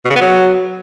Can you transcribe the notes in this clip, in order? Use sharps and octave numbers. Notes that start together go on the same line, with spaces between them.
B2
C#3
B3
F#3